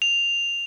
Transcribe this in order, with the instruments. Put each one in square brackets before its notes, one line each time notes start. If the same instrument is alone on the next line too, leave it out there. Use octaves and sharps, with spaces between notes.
[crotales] F7